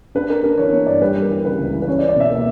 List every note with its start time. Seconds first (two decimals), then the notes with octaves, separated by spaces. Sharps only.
0.15 D4 B4
0.29 D4 A#4
0.43 D4 A#4
0.58 E3 C#5
0.72 B3 C#5
0.86 G2 D5
1.02 G3 B4
1.15 G3
1.22 A#4
1.30 E3
1.45 C#3 B4
1.59 C#2
1.74 E3
1.82 B4
1.87 C#4 C#5
1.98 D5
2.02 C#4
2.09 D5
2.16 B2 E5
2.31 A#3